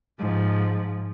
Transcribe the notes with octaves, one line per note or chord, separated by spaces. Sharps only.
G#2 F3